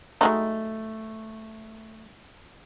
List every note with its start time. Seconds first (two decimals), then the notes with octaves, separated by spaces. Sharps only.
0.21 F#3 G#3 A3 D#4